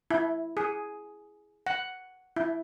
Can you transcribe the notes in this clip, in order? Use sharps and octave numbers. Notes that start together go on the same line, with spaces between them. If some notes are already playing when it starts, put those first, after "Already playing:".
E4
G#4
F#5
E4